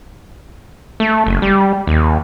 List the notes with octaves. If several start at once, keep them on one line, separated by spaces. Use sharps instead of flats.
A3
F#1
G3
D#2